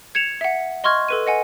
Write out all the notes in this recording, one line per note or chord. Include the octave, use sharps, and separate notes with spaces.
G#6 C#7 E7 F7
E5 F#5
D#5 C6 C#6 F6 G#6
A4 B4 D#7
D#5 F#5 G#5